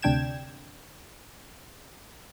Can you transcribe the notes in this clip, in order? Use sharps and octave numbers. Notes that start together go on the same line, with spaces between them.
D2 C3 D4 G5 G#6 E7